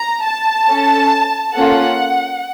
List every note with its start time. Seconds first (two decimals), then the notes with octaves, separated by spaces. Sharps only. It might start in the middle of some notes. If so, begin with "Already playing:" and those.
Already playing: A#5
0.25 A5
0.68 C#4 A4
1.55 A#3 C#4 F4 A4 F#5